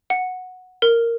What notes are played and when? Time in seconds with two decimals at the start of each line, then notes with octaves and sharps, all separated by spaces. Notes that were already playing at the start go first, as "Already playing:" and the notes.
0.10 F#5
0.82 A#4